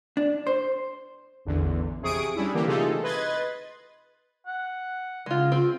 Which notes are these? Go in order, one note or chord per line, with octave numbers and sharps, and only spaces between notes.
D4
C5
A1 E2 D3
F2 C3 G#4 C#6 D#6 D7
G3 C#4 D4 E4
D3 E3 A#3 G4
C3 A3 D#4 F4 G#4 A4
B4 D#5 C6 G#6 A6
F#5
C#3 G#3 F4
C4 F4